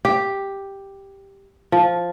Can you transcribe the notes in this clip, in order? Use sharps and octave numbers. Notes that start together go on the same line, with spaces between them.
G4
F3